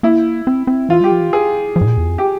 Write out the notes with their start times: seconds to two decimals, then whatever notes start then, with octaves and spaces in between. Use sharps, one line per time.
0.03 A#3 E4
0.47 C4
0.67 C4
0.89 E3 F4
1.01 G3 G4
1.11 F3
1.21 E3
1.33 G#4
1.76 F3
1.81 G#2
1.86 A#2
1.97 E2
2.08 F2
2.18 G4